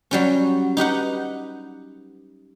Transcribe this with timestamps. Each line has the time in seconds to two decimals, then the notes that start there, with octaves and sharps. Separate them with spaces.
0.11 F#3 G3 C#4
0.77 D#4 G4 B4 F#5